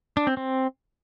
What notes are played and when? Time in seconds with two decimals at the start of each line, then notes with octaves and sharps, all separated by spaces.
0.17 D4
0.27 C4
0.37 C4